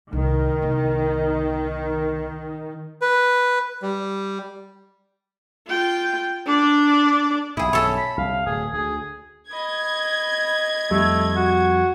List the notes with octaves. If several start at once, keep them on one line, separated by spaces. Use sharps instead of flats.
C2 D#3
C2 B3
B4
G3
F4 G5
D4 D5
B1 G2 E4 G#4 D#6
A4 C#5 E5
B5
C2 C#3 F5
D1 G#4
D2 G#4
D#5 B5 G#6
F2 G3 A3
F#4